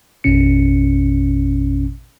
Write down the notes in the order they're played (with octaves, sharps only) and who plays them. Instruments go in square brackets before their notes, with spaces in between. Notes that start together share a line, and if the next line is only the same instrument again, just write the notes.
[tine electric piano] A1 F2 B2 C#4 C#7